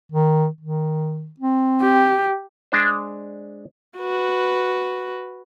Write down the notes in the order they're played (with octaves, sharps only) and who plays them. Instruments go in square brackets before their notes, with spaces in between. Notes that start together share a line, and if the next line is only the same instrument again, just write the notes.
[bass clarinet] D#3
D#3
C4
[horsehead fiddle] G4
[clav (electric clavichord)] G#3 D4 C5
[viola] F#4 B4